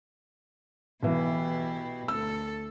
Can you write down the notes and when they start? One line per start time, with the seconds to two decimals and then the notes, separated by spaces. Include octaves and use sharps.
1.03 B1 B2 E3 E4 G4
2.08 D2 A4 E6